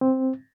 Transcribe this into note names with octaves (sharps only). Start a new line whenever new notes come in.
C4